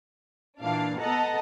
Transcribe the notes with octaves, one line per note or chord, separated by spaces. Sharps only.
A#2 E3 D4 F5
B3 A4 D#5 F#5 A5 A#5